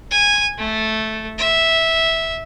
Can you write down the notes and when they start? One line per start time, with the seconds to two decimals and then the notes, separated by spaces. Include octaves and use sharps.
0.11 G#5
0.59 A3
1.39 E5